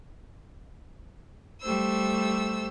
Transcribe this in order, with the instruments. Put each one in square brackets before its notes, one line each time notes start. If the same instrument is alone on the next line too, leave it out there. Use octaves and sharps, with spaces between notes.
[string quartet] G3 A3 C5 E6